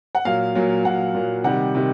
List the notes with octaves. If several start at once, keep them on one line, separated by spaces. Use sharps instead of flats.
F#5
A#2 F#3 F5
A#2 F#3
A#2 F#3 F#5
A#2 F#3
C3 D#3 G3 F#5
C3 D#3